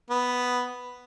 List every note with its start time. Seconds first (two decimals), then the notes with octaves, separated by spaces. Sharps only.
0.10 B3